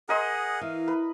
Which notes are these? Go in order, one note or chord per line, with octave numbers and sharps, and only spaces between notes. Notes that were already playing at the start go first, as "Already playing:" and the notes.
G#4 A#4 D#5 F#5 C6
E3 F5
B4